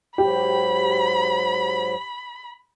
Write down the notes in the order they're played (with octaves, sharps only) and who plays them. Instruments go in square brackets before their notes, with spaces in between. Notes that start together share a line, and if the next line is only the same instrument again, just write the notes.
[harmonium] G#2 F#3 [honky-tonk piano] G4 [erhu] B5